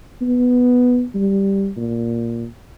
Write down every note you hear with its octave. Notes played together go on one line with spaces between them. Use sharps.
B3
G3
A#2